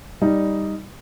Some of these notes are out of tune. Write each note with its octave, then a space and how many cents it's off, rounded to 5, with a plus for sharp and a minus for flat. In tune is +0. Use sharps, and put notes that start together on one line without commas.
G3 +5 D#4 +0 D5 +0